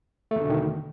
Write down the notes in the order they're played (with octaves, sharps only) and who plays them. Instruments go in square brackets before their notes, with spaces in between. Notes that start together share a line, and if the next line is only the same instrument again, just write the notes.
[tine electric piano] A3
E2
D3
B2
D#3